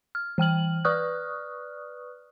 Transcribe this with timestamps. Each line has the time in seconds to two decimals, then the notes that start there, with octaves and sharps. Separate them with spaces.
0.15 F6
0.38 E3 G5 F6 F#7
0.85 B4 D5 C#6 D#6 F6 F#6